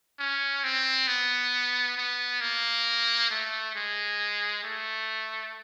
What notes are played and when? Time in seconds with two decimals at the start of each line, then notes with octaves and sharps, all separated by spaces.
0.19 C#4
0.64 C4
1.07 B3
1.97 B3
2.41 A#3
3.30 A3
3.75 G#3
4.63 A3